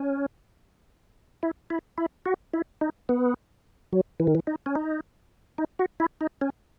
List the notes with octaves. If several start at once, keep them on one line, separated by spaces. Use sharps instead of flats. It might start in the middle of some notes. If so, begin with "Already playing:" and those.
Already playing: C#4
E4
E4
E4
F#4
E4
D#4
B3
F#3
E3
D#3
E3
D#4
C#4
D#4
D#4
F#4
E4
D#4
C#4